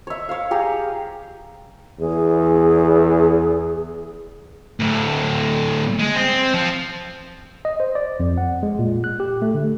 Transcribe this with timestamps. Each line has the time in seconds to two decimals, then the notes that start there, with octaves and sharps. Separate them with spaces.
0.07 C#5 E5
0.29 C#5 F5
0.51 G4 G#4 A#5
2.00 E2 G#4
4.79 D2 A2
5.99 G#3
6.16 C4
6.55 F3
7.65 D#5
7.80 C5
7.95 D5
8.20 F2
8.38 F#5
8.63 G#3
8.79 A#2
9.04 F#6
9.20 G4
9.42 A3
9.55 D3